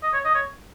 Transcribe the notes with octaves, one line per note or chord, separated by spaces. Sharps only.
D#5
C#5
D#5
C#5